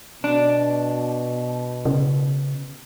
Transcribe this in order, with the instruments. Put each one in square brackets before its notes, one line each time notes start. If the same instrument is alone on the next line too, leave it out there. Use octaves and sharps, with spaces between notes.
[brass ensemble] B2 [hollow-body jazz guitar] D4
[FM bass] C#3